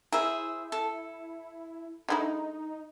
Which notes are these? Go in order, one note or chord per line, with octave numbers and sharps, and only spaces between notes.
E4 G#4 A#4 C5 E5
A4
D3 G#3 D#4 E4